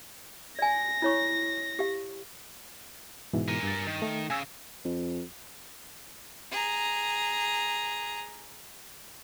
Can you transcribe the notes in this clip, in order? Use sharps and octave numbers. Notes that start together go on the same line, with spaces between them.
D5 G#5 A#6
E4 C#5 C#6
G4 F5
G#2 B2 E3
A#4 G#5
G2 A6
D#3
A3
C#3 G#5 E6
F2
G#4 A#5